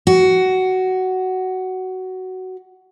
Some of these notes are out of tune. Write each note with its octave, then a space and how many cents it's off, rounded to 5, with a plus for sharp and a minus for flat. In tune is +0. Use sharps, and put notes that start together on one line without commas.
F#4 +10